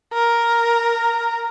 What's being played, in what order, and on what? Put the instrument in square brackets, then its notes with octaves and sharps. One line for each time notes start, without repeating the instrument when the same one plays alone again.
[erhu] A#4